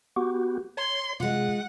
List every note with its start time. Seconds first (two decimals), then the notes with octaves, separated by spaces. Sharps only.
0.16 B3 F#4 G4
0.77 C#5 C6
1.20 C3 G#3 F4 F#5